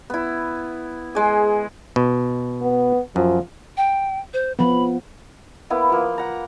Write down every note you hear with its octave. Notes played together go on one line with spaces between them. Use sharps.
B3 E4
G#3 G#4
B2
B3
F#2 F3
G5
C5
F3 B3 B5
A#3 B3 E4
F3 A#3
F#5 A#5